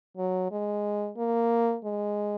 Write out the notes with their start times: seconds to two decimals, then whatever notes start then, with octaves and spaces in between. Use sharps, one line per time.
0.17 F#3
0.52 G#3
1.17 A#3
1.85 G#3